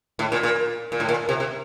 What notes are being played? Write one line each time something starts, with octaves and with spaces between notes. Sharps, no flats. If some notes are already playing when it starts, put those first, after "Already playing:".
A2
A#2
A#2
A#2
A2
A#2
C3
C3